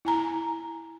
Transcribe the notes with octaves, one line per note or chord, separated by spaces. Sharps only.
E4 G#5 A#5